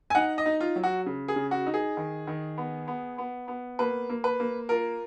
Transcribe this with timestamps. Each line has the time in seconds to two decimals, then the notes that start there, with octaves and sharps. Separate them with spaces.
0.10 G#5
0.15 D#4 F#5
0.38 D#5
0.46 D#4
0.61 F4
0.76 F#3
0.83 F#4
1.06 C#3
1.28 G#4
1.36 C#3
1.51 F#4
1.66 D#4
1.74 G#4
1.97 D#3
2.27 D#3
2.58 B3
2.88 B3
3.18 B3
3.48 B3
3.79 A#3 B4
4.09 A#3
4.24 B4
4.40 A#3
4.69 F4 A#4